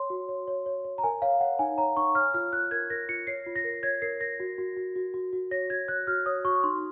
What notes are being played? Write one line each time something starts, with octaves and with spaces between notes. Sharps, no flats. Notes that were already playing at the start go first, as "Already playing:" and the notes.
Already playing: C#5 C6
F#4
C#5
C#5
C#5
C#5
A#5
A#4 G#5
C#5 F5
C#5 F#5
D#4 G#5
C#5 A#5
D#4 C#6
C#5 F6
F4 F6
F4 F#6
A#4 G#6
A#4 A#6
F4 C#7
C#5 C7
F4
A#6
A#4
C#5 G#6
A#4 C7
A#4 A#6
F#4
F#4
F#4
F#4
F#4
F#4
C#5 A#6
F#4 G#6
C#5 F#6
F#4 F6
C#5 D#6
F#4 C#6
D#4 C6